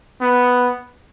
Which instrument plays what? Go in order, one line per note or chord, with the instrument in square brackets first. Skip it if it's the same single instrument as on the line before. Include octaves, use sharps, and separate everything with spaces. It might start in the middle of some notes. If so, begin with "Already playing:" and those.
[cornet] B3